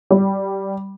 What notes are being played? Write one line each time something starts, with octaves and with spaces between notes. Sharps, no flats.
G3